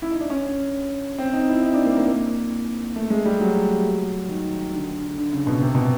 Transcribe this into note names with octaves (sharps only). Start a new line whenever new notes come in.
E4
D#4
D4
C#4
C4
D#4
E4
D#4
D4
A#3
A#3
A#3
A3
G#3
G3
F#3
D#3
D3
D3
C#3
B2
C3
B2